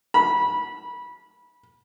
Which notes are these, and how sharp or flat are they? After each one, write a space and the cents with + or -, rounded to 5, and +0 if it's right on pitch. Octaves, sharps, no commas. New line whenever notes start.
B5 -20